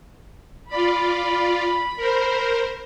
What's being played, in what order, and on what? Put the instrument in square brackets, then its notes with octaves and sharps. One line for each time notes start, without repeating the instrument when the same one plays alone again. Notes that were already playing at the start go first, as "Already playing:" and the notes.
[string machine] F4 D5 [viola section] B5
[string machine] A#4 C5